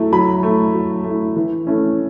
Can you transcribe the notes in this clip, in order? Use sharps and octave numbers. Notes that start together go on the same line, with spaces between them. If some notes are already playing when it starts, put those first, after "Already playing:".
Already playing: F#3 A3 E4
F#3 B5
A3 E4
F#3
A3 E4
E3
A3 C#4 E4